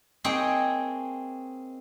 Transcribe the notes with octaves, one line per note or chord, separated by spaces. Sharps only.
A#3 C4 D#4 G#4 C#5 G5